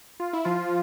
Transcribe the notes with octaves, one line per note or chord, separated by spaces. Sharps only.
F4
E4
F3 F4